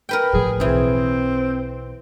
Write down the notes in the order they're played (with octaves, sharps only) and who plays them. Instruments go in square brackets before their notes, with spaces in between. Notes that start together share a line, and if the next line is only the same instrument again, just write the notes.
[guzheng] A#4 B4 G5
[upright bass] A2 F3 [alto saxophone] G#4
[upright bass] B1 [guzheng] E3 G#4 [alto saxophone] C4